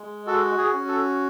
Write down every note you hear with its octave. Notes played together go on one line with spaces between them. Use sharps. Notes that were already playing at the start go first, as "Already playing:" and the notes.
Already playing: G#3
F#4 A4
G#4
C#4
A4